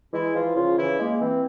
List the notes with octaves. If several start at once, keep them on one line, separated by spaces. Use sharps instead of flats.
E3 G#3 E4
E3 F3 F4
C#3 F3 F4
C#3 E3 E4
G#3 A#3
E3 C4